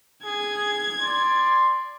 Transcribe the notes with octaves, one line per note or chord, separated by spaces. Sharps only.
G#4 G#6
D5 C6